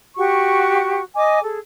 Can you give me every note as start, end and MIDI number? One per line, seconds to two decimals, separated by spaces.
0.16 1.01 66
0.16 1.01 67
0.16 1.01 78
0.16 1.01 85
1.15 1.40 75
1.15 1.40 80
1.15 1.40 86
1.40 1.58 68
1.40 1.58 69